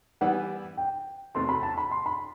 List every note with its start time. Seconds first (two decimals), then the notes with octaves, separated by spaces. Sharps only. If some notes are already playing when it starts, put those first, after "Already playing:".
0.21 E3 G3 B3 E4 B4 F#5
0.77 G5
1.35 E2 C3 F#3 A3 C4 C6
1.49 B5
1.63 A5
1.78 B5
1.91 C6
2.06 B5